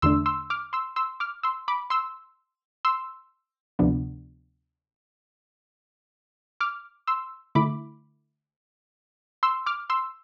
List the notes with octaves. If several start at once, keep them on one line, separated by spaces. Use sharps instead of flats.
E2 D3 A3 D4 C6 E6
C6 E6
D6 F6
C6 E6
C6 E6
D6 F6
C6 E6
B5 D6
C6 E6
C6 E6
D2 C3 F3 B3 D4
D6 F6
C6 E6
D3 A3 E4 B5 D6
C6 E6
D6 F6
C6 E6